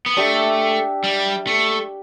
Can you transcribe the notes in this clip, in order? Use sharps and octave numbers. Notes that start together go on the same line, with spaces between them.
B3
A3 D4 G4 E5
G3
A3